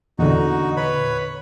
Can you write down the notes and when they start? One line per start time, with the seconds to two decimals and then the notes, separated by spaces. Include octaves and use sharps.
0.19 E2 A#2 D3 D#4 F#4
0.77 B4 C#5 B5